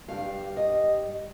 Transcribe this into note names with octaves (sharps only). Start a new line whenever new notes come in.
G2 G3 F5
D#5